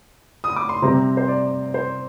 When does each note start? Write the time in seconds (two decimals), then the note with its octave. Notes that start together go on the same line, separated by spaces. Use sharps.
0.44 D#6
0.56 D6
0.69 C6
0.82 C3 G3 C4 A#5
1.17 C5
1.28 D5
1.74 C5